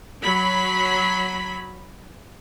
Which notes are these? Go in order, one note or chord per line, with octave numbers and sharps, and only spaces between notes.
F#3 B5